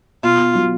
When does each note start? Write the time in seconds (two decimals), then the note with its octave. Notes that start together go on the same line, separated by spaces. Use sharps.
0.23 B2 F4
0.39 B2
0.55 F#3